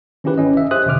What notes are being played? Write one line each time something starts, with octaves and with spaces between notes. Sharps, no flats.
D#3 C#4 E4 G4 B4
G#1 C#4 D#5
E5
G4 C5 E5 D#6 F#6
E2 B2 D3 D6 F6